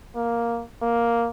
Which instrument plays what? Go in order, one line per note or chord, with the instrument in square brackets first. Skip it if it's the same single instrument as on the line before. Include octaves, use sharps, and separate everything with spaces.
[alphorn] A#3
A#3